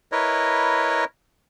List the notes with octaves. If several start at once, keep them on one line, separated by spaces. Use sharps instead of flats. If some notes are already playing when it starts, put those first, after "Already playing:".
E4 A#4 B4 C#5 D#5